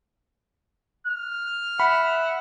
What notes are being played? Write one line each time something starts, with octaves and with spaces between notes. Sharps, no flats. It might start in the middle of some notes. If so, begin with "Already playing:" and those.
F6
E5 F#5 B5